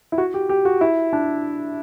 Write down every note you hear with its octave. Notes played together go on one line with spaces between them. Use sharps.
E4
F#4
G4
G4
F#4
E4
D4